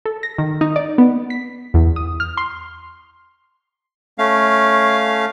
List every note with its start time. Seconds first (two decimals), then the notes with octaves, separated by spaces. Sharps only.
0.06 A4
0.23 A#6
0.38 D#3
0.61 D#4
0.76 D5
0.98 B3
1.30 B6
1.74 E2
1.96 D#6
2.20 F6
2.37 C6
4.18 A3 C#4 F5